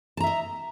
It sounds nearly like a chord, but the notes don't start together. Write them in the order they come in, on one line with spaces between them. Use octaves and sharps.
A5 A#5 E5 D#5